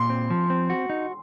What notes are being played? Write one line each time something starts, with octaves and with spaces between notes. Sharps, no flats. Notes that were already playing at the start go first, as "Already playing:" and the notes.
Already playing: A#2 C6
C4
F3
C4
F#4
D#4